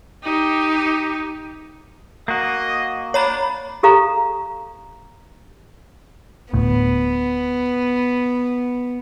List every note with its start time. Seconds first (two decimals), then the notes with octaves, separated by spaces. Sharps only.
0.23 D#4 G4
2.28 A#3 F#4 D#5
3.14 D4 C#5 A#5 B5
3.83 G4 A4 F5 A#5
6.54 D1 D2 A2 B3